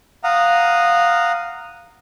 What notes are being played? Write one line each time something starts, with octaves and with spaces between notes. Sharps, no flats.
F5 F#5 A#5 D#6